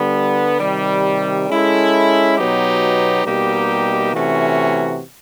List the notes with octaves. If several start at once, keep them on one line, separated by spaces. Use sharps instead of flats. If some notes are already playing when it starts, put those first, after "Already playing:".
Already playing: D3 G3 B3
C3 D#3 G3
G#3 C#4 E4 A4
B2 F#3 B3 D#4 G4
B2 G3 A#3 D#4 G4
C3 E3 A3 C#4 F#4